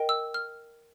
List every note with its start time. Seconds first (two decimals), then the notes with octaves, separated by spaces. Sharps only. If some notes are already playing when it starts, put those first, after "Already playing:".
Already playing: A#4 D#5 G5
0.09 E6
0.34 F6